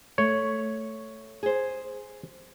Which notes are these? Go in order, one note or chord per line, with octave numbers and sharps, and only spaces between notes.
A3 C#5
G#4 C5